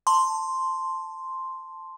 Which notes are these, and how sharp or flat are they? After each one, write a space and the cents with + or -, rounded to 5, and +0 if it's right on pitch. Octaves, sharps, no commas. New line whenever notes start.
A5 +0 C6 +0